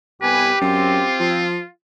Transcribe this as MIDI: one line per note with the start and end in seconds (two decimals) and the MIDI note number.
0.22 0.51 36
0.22 0.51 59
0.22 1.30 67
0.22 0.56 71
0.22 0.51 80
0.61 1.05 42
0.61 1.47 60
0.61 1.70 65
1.20 1.61 53